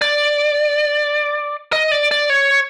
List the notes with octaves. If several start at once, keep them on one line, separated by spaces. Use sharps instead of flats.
D5
D#5
D5
D5
C#5